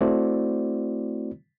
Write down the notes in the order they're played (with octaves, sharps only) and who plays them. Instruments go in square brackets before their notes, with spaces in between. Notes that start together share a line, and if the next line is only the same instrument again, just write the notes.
[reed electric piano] A3 C4 E4 F#4 C5 D5